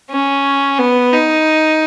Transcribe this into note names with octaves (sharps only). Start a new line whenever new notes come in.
C#4
B3
D#4